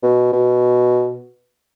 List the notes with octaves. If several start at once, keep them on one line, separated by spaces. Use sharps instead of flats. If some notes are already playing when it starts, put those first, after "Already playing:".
B2
B2